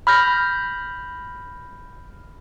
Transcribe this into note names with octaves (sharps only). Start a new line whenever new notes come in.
B5 F6 G6 A#6